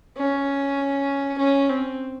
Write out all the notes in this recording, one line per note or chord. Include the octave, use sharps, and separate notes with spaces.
C#4
C#4
C4